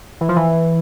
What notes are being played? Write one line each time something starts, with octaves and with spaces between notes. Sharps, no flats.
E3
F3
E3